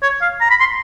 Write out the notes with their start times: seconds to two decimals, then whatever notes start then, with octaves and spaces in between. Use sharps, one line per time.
0.02 C#5
0.21 F5
0.41 A#5
0.50 B5
0.60 C6